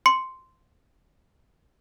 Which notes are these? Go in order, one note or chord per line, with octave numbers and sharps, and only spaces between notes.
C6 C#7